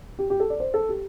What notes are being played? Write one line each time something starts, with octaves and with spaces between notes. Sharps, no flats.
G4
G4
A4
D5
C5
A4
G4